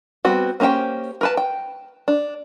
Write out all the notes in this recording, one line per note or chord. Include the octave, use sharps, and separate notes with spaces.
G3 B3 C4 F#4
A#3 C#4 G4 C5 G5
A#4 B4 A5
G5
D4